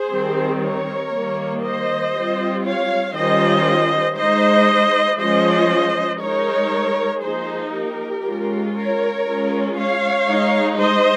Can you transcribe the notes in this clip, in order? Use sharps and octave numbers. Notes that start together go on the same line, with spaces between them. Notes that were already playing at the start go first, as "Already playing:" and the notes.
Already playing: G#4 C5
D#3 G3 C4
A#4 C#5
D#3 G3 A#3
C5 D#5
G3 C4 F4
C#5 F5
D#3 G3 C#4 F4 C5 D#5
G#3 D#4 C5 D#5
F3 G#3 C#4 F4 C5 D#5
G#3 D#4 A#4 C#5
F3 A#3 D#4 G#4 C5
G4 A#4
G#3 C#4 F4
A#4 C#5
G#3 C#4 F4
C#5 F5
G#3 D#4
C5 D#5